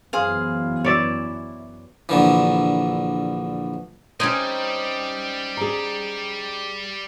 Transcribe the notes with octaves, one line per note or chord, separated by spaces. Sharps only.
F#2 E3 B3 G#4 C5 F5
E4 C#5 D5 E5
A#1 D3 E3
G3 C4 C#4 D#4 G#5
G#4 A#5